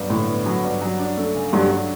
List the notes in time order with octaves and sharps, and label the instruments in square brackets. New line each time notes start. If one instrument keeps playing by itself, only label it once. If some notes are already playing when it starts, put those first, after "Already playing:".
Already playing: [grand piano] G2 F#3 B3
[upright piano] A2 [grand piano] D3
[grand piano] B3
F#3
G2
F#3
D4
A3
C#3
[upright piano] G2 [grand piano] F#3
[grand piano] D4